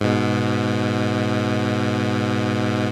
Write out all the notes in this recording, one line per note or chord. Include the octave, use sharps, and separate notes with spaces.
G#2 B2